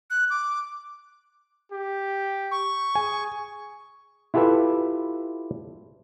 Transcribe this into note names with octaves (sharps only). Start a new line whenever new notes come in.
F#6
D6
G4
C#6
G#4 G#5
E4 F4 G4 A4 B4 E5